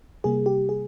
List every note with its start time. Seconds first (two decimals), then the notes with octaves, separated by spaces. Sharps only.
0.24 C3 G3 A#3 G#4
0.46 G4
0.69 G#4